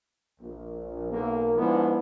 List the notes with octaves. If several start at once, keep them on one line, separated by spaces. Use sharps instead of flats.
A#1
B1 A#3
G#2 F3 G#3 B3 D4 E4